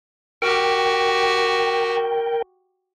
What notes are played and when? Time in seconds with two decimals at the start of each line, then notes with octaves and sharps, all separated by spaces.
0.42 F#4 G4 A#4 G5